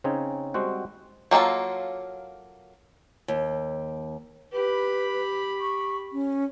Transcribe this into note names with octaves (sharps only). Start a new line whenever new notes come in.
C#3 C4 C#4 D#4 C#5
G3 G#3 C4 F#4 C5 F#5
F#3 A#3 D#4 F4 A4
D#2
G4 B4 B5
C#6
C#4